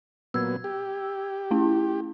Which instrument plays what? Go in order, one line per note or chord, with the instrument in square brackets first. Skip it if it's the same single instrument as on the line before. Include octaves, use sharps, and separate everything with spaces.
[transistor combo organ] A#2 F#3 B3 [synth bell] E6 G#6
[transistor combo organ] G4
[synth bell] A3 C#4 E4